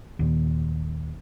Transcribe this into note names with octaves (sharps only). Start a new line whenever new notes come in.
D#2 A#2